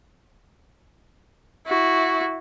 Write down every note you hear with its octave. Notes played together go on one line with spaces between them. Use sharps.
E4 F#4